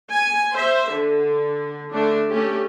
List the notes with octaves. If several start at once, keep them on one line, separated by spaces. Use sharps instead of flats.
G#5
C5 E5
D3
D3 A3 D4
A3 C#4 G4